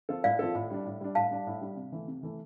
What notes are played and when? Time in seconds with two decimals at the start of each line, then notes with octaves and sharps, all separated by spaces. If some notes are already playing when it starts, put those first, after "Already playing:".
0.09 F3 C4 F4 A4
0.24 A2 D5 F5
0.39 F3 C4 F4 A4
0.54 A2
0.70 G3 D4
0.85 A2
1.01 G3 D4
1.15 A2 F5 A5
1.31 G3 D4
1.47 A2
1.61 G3 D4
1.77 C3
1.92 E3 A3
2.08 C3
2.23 E3 A3